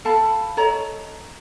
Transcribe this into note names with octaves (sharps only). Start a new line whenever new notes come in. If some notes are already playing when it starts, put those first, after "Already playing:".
A4 F5 A5 B5
A4 C#5 D#5 A#5